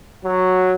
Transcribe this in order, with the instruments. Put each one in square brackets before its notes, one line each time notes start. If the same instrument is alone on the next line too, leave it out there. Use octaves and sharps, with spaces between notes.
[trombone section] F#3